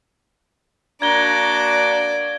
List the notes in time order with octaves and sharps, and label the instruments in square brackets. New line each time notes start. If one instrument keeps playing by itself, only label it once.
[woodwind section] A#3 D4 F#4 [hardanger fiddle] D5 [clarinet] A#5 [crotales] G#6 G7